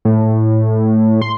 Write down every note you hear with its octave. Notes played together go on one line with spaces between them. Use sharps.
A2
C6